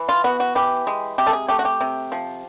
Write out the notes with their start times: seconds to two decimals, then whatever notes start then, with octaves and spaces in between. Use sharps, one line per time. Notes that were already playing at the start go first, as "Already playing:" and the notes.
Already playing: E3
0.09 F4
0.24 B3 F#4
0.40 F#4
0.55 E3 G4
0.87 G#3
1.18 C3 G4
1.27 A4
1.33 G#4
1.48 A3 G4
1.59 F#4
1.65 G4
1.81 C3
2.12 F3